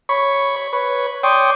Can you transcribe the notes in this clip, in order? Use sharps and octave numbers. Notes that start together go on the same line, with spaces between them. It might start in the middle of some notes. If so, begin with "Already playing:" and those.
C#5 B5 C#6
C#5
B4 C#5
C#5 D5 G5 C6 D#6